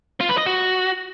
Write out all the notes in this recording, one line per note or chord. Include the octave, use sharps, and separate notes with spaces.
F4
B4
D#5
F#4